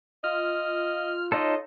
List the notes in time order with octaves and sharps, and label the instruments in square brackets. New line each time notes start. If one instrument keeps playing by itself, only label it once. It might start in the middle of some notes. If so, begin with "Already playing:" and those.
[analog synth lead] F4 [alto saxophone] D#5 [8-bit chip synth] F6
[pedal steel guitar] D#4 F4 A4 [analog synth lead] C#5 [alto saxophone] D#5